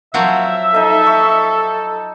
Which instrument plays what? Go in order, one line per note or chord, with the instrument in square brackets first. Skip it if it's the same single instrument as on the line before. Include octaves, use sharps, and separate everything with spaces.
[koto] F3 F#3 C4 [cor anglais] E5
[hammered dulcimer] D#4 D#5 [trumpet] A4
[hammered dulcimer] C#6